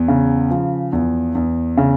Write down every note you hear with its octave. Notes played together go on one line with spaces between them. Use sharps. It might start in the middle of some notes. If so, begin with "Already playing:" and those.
Already playing: E2
C#3
F3
E2
E2
C#3